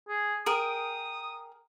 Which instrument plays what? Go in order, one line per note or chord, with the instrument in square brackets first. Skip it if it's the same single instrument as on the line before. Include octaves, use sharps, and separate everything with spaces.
[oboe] G#4
[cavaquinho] G#4 A#4 G5 [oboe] D#6